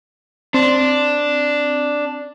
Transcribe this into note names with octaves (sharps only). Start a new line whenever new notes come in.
C4 D4